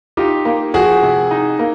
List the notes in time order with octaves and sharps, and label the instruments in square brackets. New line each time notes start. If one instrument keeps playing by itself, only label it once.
[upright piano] D#4 [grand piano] F4 G4
[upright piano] A#3
[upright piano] F3 [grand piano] F#4 G#4
[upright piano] C3
D#4
A#3